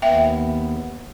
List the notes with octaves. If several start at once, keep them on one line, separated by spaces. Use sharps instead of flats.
D#2 B3 E5 G5